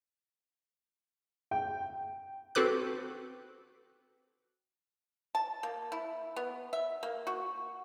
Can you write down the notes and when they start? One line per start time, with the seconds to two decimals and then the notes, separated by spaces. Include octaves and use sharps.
1.51 G5
2.55 C4 F#4 A4 B4 D6 F#6
5.35 A5
5.63 A#3
5.92 E4
6.36 B3
6.73 E5
7.03 A#3
7.27 F#4